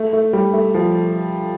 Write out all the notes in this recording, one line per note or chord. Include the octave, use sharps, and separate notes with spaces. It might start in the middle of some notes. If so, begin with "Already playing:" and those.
Already playing: A3
A3
G3
A3
F3